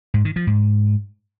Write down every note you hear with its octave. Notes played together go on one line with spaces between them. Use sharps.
G#2
D#3
F3
G#2